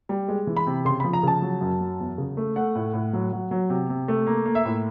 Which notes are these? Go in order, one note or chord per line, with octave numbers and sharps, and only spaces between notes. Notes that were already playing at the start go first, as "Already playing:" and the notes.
G3
G#3
E3
B5
C3
C#3 C6
F3 B5
A#5
C#3 A5
F#3
F#2
F#3
E2
C#3
A3
A3 F#5
A2
A2
F#3
F#3
F#3
C3
C3
A3
A#3
A#3
E5
A2